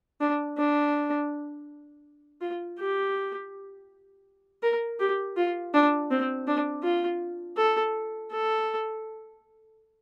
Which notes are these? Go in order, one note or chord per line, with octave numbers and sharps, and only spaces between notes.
D4
D4
F4
G4
A#4
G4
F4
D4
C4
D4
F4
A4
A4